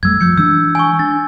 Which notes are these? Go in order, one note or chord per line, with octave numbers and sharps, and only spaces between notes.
F#2 G3 A3 E6 G#6
F3 E6 G6 C#7
E3 G#3 D4 E6
G#5 C#6
D4 A6